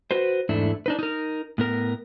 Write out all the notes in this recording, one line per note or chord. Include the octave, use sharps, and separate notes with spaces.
F#4 B4 C5
E2 G#2 A3 D4 E4
D4 D#4 B4
D#4 A#4
A2 B3 A#4